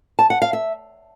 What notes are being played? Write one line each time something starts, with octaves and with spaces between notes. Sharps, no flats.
A5
F#5
F5
E5